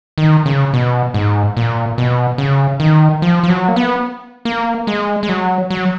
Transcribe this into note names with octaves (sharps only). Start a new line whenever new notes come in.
D#3
C#3
B2
G#2
A#2
B2
C#3
D#3
F3
F3
F#3
A#3
B3
A#3
G#3
G#3
F#3
F#3